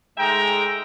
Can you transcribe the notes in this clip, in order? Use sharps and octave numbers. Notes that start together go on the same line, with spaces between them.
G#2 G#3 A3 E5 G5 A#5